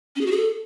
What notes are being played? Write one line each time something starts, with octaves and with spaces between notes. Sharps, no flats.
C#4
G#4
F#4
G#4
A4